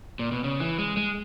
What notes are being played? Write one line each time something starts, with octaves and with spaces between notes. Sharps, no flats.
A#2
B2
C#3
E3
G#3
G#3